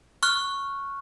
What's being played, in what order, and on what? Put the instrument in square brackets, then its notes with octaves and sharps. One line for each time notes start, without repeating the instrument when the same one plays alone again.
[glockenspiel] C#6 F6 F#6